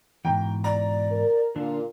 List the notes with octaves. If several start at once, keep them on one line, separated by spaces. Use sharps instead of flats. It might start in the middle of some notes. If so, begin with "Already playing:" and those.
G#2 B2 E3 G5 A#5
D5 A#5
A#4
A#2 D3 D4 F4